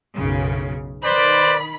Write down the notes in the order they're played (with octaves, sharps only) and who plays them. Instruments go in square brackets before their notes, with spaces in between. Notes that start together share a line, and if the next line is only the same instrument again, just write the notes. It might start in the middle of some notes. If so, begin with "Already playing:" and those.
[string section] B1 F#2 C#3
[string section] D#3 B5 [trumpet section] B4 C5 D5